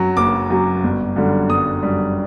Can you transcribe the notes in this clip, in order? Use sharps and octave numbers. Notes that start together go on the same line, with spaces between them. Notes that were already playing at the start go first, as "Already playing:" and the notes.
Already playing: F#2 F#3
F#1 D6
F#2 F#3
G1
F#2 D3 G3
G1 D#6
F#2 D3 G3